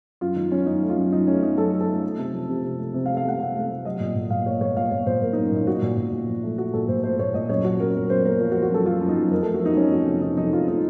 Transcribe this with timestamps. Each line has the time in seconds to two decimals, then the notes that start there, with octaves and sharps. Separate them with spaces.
0.21 F#2 F4
0.36 D#3 D#4
0.52 F#2 C#4
0.66 F#2 D#4
0.82 A3
0.89 F4
0.97 F#2
1.12 F#2 D#4
1.27 A3 C#4
1.42 F#2 D#4
1.58 F#2 A4
1.73 F#2
1.81 A4
1.88 A3
2.03 A3
2.18 C3
2.34 F3
2.49 C3
2.64 C3
2.79 A3
2.94 C3
3.06 F5
3.10 A3
3.17 F5
3.24 A3 F#5
3.40 C3 F5
3.55 A3
3.70 C3
3.85 F#3 D#5
4.00 A#2
4.16 A#2
4.30 A#2 F5
4.46 A#3 C#5
4.61 A#2 C#5
4.76 A#2 F5
4.91 A#2 C#5
5.06 A#2 C5
5.22 A#2 A#4
5.33 D#4
5.37 F#3
5.45 C#4
5.52 A#2 D#4
5.67 A#2 F#4
5.82 A#2
5.97 A#2
6.13 A#2
6.28 F3
6.43 A3
6.58 A3 F#4
6.73 A#2 A4
6.88 A#2 C5
7.03 A3 C5
7.19 A#2 C#5
7.34 A#2 D#5
7.49 F#2 C#5
7.64 F#2 F#4
7.79 F#2 A#4
7.94 F#2 A#4
8.10 F#2 C5
8.25 A#3 A#4
8.40 F3 F4
8.52 F#4
8.56 F3
8.63 F#4
8.71 F#2 A4
8.85 F#2 F4
9.01 F#2
9.09 D#4
9.16 F#2
9.31 F2 A#4
9.43 A4
9.46 A3
9.54 F#4
9.61 F3 D#4
9.77 F3 C#4
9.92 F2 F#4
10.07 C3
10.22 C3 D#4
10.37 F2 D#4
10.52 F3 F4
10.67 A3 D#4